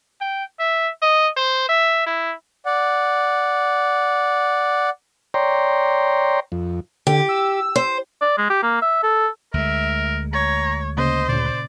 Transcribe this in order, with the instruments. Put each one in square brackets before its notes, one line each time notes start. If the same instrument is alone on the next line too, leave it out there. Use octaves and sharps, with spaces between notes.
[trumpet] G5
E5
D#5
C5
E5
E4
[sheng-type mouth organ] D5 F#5
[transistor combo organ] C#5 D5 G5 A#5 C6
F2
[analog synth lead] D3 [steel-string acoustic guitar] G4
[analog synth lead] E6
[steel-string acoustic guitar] C5
[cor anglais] D5
G#3
G4
A#3
E5
A4
[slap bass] D2 G#3 [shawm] A#4 [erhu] E5
[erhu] C#5 [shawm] A#5 [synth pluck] G#6
[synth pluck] C#3 A#3 [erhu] C5 [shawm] D#5
[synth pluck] A#2 C#3 [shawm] D5